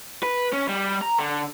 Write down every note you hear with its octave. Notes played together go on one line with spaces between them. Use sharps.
B4
C#4
G3
A#5
D3